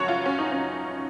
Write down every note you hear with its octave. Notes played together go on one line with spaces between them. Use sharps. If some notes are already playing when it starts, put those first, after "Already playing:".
Already playing: G#1 F#2 C#3 F3 F#4 C#5
F4
C#4
D#4
C#4